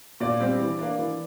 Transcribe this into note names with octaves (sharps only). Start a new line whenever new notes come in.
A#2 D5
G3 C4
E3
A#3 D4
E3